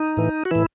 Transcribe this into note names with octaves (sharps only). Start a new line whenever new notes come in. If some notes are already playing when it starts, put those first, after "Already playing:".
Already playing: D#4
A2 E3
F#4
A2 E3 E4